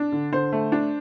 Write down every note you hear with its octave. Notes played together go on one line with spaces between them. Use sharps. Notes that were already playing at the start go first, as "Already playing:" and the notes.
Already playing: D4
D3
D3 C5
A3
D4